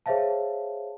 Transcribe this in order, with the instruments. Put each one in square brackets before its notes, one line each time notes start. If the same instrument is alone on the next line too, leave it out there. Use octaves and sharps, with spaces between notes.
[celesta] G#4 C5 C#5 E5 F5 A5